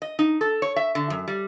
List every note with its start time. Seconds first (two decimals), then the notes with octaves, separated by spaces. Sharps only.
0.02 D#5
0.19 D#4
0.41 A4
0.62 C#5
0.76 E5
0.95 D3
1.10 F#2
1.28 G3